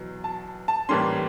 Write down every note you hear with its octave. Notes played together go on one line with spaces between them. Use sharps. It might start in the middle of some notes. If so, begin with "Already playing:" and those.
Already playing: E2 B2 F#3 B3
A5
A5
A2 E3 G3 A#3 C#4 C6